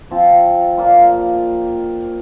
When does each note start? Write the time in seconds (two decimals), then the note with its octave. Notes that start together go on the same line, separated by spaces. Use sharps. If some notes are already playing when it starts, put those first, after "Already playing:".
0.11 F3 C4 F4
0.78 A#2 A#3 F4